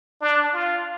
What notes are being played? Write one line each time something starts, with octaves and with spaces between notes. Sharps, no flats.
D4
F4